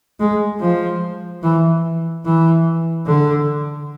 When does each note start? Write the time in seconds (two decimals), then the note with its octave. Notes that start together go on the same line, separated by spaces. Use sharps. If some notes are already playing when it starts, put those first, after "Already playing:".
0.20 G#3
0.60 F3
1.43 E3
2.25 E3
3.06 D3